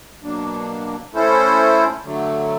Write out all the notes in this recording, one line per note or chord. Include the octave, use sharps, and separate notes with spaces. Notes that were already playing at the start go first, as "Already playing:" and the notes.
B2 F#3 A#3 D4
A3 C#4 E4 A4 C5
D3 F#3 A3